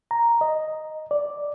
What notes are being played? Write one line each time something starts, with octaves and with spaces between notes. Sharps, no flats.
A#5
D#5
D5